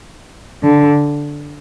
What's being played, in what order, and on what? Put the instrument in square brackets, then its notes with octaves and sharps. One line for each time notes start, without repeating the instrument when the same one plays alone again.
[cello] D3